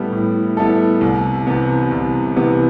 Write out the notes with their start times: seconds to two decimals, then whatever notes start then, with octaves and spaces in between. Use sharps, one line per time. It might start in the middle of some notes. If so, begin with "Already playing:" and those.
Already playing: A2 G3 B3 E4 A4
0.12 A2
0.57 G3 B3 E4 A4
1.01 C2
1.47 C3 E3 B3
1.91 C2
2.37 C3 E3 B3